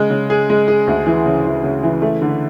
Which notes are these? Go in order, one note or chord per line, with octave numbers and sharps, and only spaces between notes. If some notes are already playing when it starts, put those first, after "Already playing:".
Already playing: C#3 G#3
C#3
G#4
G#3
G#4
D2
E3
C#3
E3
C#3
E3
A3
D3